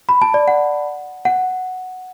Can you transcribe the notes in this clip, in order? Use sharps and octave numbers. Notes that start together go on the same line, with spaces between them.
B5
A5
D5
F#5
F#5